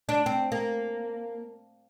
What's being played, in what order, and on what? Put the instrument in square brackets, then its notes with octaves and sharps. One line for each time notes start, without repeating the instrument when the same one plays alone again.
[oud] D4
C4
A#3